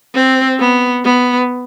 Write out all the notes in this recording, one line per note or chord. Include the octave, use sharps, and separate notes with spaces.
C4
B3
B3